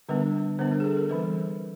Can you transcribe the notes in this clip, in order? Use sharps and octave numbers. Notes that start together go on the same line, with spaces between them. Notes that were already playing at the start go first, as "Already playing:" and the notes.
D3 G3 B3 D4 B4
D3 G3 B3 D4 C5
A#4
G#4
A4
A#4
E3 G3 C4 B4